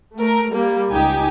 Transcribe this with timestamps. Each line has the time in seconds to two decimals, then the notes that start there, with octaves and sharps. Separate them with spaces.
0.14 A3 A#4
0.51 G3 A#3
0.91 C#2 D#4 G4 G#5